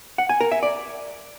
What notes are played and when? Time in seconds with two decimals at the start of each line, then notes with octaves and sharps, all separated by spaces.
0.18 F#5
0.29 G#5
0.40 A#4
0.52 E5
0.63 D5